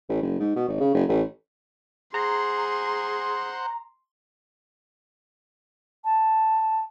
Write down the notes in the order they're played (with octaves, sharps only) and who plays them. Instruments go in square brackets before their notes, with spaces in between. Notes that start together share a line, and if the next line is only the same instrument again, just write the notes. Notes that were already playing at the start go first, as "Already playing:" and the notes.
[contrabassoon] A1
F#1
G#2
B2
G#1
C#3
F#1
A1
[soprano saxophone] G#4 [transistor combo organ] C5 F#5 [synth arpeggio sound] A#5 [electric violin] C6
[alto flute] A5